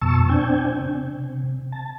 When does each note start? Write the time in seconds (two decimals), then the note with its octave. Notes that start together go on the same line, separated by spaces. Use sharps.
0.02 F2 B2 A5 C#6 E6
0.29 C4 D4 G5 G#5
0.81 C3
1.72 A5